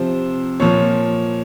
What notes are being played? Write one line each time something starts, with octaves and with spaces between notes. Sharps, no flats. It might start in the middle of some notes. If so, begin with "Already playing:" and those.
Already playing: C3 F3 C5
A#2 F3 C#5